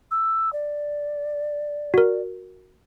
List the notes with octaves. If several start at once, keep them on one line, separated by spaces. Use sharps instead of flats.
E6
D5
F#4 A#4